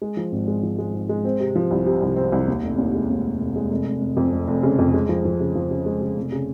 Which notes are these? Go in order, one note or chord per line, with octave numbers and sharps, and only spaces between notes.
G#3
F3
G#1
G#3
F3
G#3
G#2
G#3
C4
C3
F3
C2
C3
C2
C4
C2
D#2
F1
D#2
G#3
D#2
F1
F1
G#3
F1
F1
F1
F2
F1
F1
C#3
F2
G#3
F3
F3
C#3
F3
C#3
G#3
C#3
F1
C#3